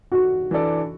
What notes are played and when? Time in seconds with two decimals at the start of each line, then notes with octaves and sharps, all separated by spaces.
0.12 F#4
0.51 E3 D4 A4 D5